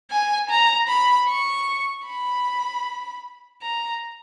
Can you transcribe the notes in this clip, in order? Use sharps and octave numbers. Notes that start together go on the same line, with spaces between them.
G#5
A#5
B5
C#6
B5
A#5